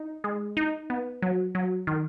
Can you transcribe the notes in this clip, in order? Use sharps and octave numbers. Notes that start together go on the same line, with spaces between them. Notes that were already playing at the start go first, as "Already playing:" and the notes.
Already playing: D#4
G#3
D#4
B3
F#3
F#3
D#3